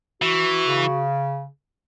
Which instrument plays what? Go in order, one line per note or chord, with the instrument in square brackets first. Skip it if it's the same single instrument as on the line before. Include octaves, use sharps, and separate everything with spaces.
[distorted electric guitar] E3 [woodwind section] F#4
[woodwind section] C#3